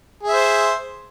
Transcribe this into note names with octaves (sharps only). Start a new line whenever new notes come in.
G#4 C5 E5